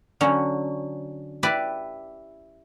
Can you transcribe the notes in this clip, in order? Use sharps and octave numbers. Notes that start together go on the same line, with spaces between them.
D3 F#3 C#4
E4 G4 B4 D5 A5